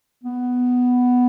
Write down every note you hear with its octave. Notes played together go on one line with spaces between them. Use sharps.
B3